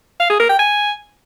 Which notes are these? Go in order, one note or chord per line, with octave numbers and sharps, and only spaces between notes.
F5
G#4
A#4
G5
G#5